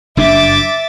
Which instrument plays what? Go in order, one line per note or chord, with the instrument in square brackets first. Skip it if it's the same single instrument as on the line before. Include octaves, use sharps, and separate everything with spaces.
[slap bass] F#1 G2 D4 [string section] E5 D6 A6